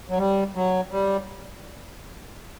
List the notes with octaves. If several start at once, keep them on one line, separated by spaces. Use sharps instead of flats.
F#3
G3
F#3
G3